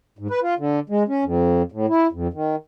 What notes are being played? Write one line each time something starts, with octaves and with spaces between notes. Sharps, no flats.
G#2
B4
F4
D3
G#3
C#4
F2
A2
E4
F2
D#3